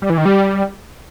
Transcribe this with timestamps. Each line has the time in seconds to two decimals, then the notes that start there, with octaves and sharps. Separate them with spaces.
0.02 G3
0.10 E3
0.18 D#3
0.25 G3